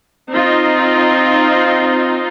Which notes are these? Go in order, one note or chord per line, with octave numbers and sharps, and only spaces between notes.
C4 D#4 F4